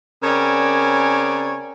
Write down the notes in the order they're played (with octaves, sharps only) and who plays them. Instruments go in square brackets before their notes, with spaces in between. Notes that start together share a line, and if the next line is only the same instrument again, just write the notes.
[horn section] C#3 C4 A#4 C#5 D5 G#5